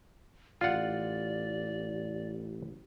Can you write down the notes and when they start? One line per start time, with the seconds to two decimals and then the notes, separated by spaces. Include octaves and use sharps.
0.61 A1 F4 D5 F#5